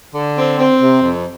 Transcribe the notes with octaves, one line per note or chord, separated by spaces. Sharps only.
D3
C4
C4
C3
F2